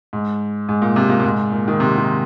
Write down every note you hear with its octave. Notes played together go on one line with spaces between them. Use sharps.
G#2
G#2
A#2
C3
A#2
A#2
G#2
A#2
D#3
C3
D#3